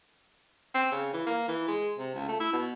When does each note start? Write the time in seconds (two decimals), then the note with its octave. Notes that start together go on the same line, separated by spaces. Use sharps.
0.75 C4
0.92 C#3
1.14 E3
1.27 A#3
1.48 E3
1.68 G#3
1.99 C3
2.15 C#2
2.28 A3
2.40 E4
2.53 B2